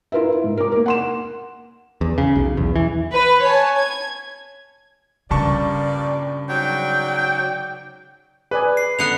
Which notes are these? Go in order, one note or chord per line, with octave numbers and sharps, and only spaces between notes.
E4 F4 A#4 B4 E5
G#2
A#4 D6
A#3 A#4
F#5 C6 E7
E2
C#3
B1
E2
E3
B4
C#5 G#5 A5
G#6
G2 A#2 C#3 G3 D5 A5 C#6
G#2 F#3 D5 G5
G#4 B4 D5 G#5
C7
D3 B3 F#5 F#6 C#7 F7